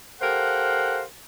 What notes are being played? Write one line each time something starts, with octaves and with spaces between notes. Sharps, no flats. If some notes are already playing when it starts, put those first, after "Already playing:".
G4 A4 A#4 C5 F5 F#5